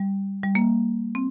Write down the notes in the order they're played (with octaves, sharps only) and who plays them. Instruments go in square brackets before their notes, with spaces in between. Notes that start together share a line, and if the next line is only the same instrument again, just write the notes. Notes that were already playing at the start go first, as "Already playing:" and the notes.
Already playing: [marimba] G3
G3
A#3
C4